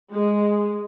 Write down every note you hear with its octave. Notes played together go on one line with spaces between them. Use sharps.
G#3